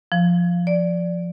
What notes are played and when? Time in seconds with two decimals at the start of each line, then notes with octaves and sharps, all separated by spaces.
0.12 F3
0.67 D5